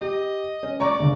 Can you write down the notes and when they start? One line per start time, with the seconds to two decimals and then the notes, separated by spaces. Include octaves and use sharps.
0.01 G4 D#5
0.63 C#4
0.80 D5 A#5 C#6 D6
0.99 G1 C#2